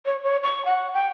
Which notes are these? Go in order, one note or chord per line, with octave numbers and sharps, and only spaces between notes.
C#5
C#5
C#6
F#5
G5